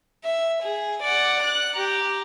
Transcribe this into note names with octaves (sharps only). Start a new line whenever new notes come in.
E5
G#4
D5 F#5
F#6
G4 A#5